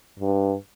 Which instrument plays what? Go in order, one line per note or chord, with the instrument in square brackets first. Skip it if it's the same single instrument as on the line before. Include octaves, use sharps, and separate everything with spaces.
[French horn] G2